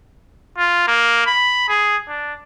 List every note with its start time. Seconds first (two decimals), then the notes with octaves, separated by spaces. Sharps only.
0.58 F4
0.88 A#3
1.27 B5
1.68 G#4
2.08 D4